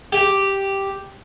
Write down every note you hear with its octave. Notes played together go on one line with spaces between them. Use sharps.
G4